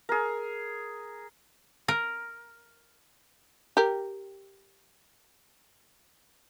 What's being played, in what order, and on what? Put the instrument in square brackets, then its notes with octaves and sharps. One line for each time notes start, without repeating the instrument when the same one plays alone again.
[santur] G#4 A#4
[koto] A#4
[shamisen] G4 A#4